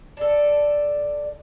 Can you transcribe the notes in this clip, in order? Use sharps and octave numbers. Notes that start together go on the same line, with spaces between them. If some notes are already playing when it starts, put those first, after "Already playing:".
D4 A4